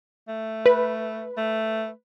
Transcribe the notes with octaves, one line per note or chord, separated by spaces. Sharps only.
A3
B4
A3